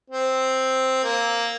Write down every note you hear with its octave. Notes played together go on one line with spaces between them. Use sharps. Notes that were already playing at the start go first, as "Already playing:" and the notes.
C4
A#3